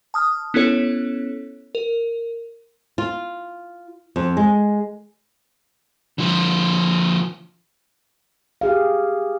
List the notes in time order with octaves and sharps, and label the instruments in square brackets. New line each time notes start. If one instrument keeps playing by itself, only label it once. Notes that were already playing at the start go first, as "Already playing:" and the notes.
[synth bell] A5 D#6 F6
B3 C#4 E4 A4 C#5
A#4
[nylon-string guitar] F4
F2
G#3
[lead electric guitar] D3 F3
[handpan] G4 G#4 F5